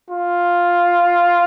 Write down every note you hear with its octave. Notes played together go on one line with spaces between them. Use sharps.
F4